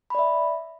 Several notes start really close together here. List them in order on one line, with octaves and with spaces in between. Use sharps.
B5 D5 E5